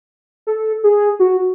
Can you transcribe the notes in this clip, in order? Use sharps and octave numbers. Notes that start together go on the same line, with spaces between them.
A4
G#4
F#4